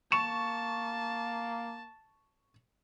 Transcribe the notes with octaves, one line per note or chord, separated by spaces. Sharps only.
A#3 A5 C#6 E7